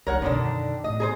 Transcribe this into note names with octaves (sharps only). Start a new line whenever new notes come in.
C#2 D#4 A#4 C#5 F#5
F#2 B2 D3 D#3 D4
A2 D#5
G#4 A#4 C5